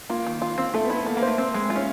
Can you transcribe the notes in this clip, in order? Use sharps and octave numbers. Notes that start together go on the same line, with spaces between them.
A#3 F4
D#3
F4
C4
A3 A4
B3
E4
B3
A#3 A4
A#3
C5
A3
C4
G#3
F4
C#4